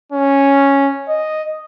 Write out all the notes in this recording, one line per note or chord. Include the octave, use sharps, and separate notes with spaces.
C#4
D#5